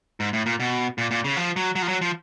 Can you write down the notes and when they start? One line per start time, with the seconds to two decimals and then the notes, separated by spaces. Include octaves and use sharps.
0.20 G#2
0.33 A2
0.46 A#2
0.60 B2
0.98 A#2
1.11 A#2
1.24 C#3
1.37 F3
1.56 F#3
1.75 F#3
1.82 F3
1.88 F#3
2.01 F3